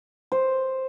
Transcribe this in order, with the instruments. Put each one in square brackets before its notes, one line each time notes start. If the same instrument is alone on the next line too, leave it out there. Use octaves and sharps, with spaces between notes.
[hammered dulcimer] C5